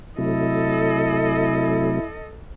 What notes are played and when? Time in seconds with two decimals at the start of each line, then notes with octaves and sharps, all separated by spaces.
0.18 C3 F#3 A3 E4 A4 D#5